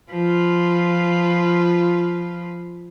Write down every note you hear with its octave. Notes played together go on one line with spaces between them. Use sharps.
F3 F4 B4